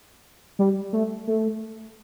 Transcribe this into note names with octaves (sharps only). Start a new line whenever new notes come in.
G3
A3
A3